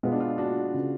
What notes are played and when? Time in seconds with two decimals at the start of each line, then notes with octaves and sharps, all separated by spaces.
0.03 B2 G#3 B3 F4
0.12 D4
0.20 F4
0.38 D4 F#4
0.74 C#3